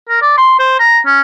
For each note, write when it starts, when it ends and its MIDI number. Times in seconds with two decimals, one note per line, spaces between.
0.09 0.21 70
0.22 0.35 74
0.37 0.55 84
0.59 0.79 72
0.80 0.99 82
1.06 1.22 61